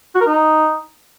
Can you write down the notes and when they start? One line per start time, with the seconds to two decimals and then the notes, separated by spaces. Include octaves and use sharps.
0.15 F#4
0.21 A#4
0.27 D#4